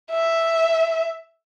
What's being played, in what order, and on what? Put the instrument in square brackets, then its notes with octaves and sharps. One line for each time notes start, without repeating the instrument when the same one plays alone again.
[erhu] E5